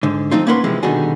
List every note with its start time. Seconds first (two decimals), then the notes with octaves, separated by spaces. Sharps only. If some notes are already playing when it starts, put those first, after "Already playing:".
0.03 G#2 D3
0.31 F3 A3 C4 D#4 F4
0.47 A#3 C#4 A#4 B4 F#5 C6
0.64 C3 E3 F3 G#3
0.83 B2 D3 D#3 G3 F#4 G#4